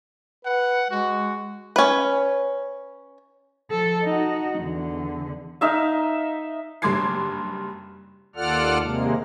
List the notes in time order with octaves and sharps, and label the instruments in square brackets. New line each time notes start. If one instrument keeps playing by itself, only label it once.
[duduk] B4 [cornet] F#5
[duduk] G#3 [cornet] F#4
[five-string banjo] C#4 B4
[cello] F3 A4
D#4 F#4
E2 D3
[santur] D#4 E5 F5
[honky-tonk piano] F#1 G2 C6 D6 G#6 C7
[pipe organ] D#2 F4 A4 D5 F#5 F6
D#2 C3 G#3 A#3